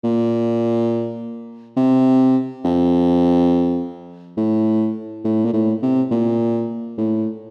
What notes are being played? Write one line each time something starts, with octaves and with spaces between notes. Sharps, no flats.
A#2
C3
F2
A2
A2
A#2
A2
C3
A#2
A2